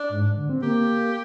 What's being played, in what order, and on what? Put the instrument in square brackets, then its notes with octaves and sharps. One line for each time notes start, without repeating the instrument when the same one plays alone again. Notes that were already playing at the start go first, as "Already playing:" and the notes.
Already playing: [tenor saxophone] D4
[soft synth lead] G#2
D3
C4
[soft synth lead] A#3 [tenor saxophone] G4